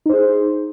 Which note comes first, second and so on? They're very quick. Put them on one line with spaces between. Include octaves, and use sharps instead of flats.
D#4 C5 G#4